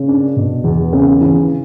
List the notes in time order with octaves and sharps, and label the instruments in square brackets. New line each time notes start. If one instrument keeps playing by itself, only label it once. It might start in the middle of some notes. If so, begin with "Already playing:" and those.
Already playing: [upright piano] C#3
D4
B2
E2
C#3
E3